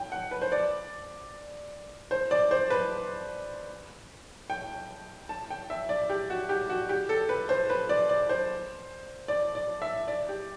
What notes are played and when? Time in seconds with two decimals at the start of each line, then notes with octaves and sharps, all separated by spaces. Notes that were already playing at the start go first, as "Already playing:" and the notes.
Already playing: G5
0.12 F#5
0.31 B4
0.42 C5
0.52 D5
2.11 C5
2.31 D5
2.51 C5
2.70 B4
4.50 G5
5.29 A5
5.50 G5
5.70 E5
5.89 D5
6.10 G4
6.30 F#4
6.49 G4
6.69 F#4
6.89 G4
7.09 A4
7.29 B4
7.49 C5
7.70 B4
7.89 D5
8.09 D5
8.29 C5
9.28 D5
9.55 D5
9.82 E5
10.08 D5
10.29 G4